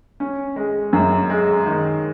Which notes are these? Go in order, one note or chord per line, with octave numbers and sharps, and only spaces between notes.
C#4
G#3
F#2
G#3
D#3